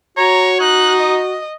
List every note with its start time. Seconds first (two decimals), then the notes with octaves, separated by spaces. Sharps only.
0.18 F#4 C#5 A#5
0.60 D#4 F#6
1.01 D#5